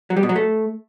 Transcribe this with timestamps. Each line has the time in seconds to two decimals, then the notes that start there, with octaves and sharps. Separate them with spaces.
0.10 F#3
0.17 G3
0.23 B2
0.29 F#3
0.36 A3